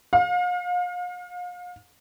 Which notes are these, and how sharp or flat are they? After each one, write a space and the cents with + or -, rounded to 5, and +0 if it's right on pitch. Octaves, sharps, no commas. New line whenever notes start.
F5 +40